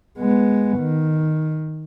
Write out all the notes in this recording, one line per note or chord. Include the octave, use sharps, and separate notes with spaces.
G#3 B3
D#3